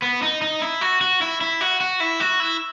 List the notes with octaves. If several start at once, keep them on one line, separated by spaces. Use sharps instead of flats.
B3
D#4
D#4
E4
F#4
F#4
E4
E4
F#4
F#4
E4
F#4
E4